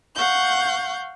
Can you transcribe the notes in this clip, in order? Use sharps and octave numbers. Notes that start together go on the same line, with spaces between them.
F5 F#5 C#6 G6